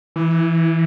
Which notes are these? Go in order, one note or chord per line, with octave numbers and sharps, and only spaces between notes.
E3